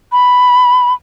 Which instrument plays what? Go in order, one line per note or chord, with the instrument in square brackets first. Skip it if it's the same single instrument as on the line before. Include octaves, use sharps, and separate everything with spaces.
[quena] B5